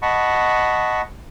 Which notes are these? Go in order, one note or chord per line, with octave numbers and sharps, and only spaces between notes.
D#5 F#5 A5 B5 C#6